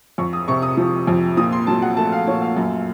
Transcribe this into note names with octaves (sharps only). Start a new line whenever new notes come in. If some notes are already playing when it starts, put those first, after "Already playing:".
F2 C#6
D#6
C3 C#6
D#6
F3
F2
A#2 D#6
C6
F#3 A5
F#5
A3 A5
F5
A#2 C#5
F5
F#2